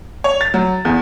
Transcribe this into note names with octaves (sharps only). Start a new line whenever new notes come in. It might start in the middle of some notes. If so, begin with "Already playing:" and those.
C#5
A6
F#3
E2